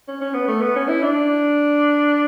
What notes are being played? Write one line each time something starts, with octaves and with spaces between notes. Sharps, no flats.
C#4
C#4
B3
A3
B3
C#4
E4
D4